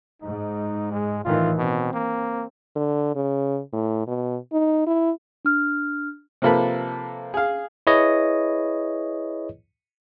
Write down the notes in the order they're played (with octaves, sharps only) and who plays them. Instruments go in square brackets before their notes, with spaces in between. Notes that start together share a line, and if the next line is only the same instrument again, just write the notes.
[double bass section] G#2 [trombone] D#4
[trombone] G#3
[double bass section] A2 D#3 E3 [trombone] F4
[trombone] B2 [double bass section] C4
[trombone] A#3
[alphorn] D3
C#3
A2
B2
D#4
E4
[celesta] D4 F6
[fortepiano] C3 F3 A#3 A4 B4
G#4 F5
[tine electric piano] E4 G#4 B4 C#5 D#5